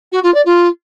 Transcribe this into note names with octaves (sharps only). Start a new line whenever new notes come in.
F#4
F4
D5
F4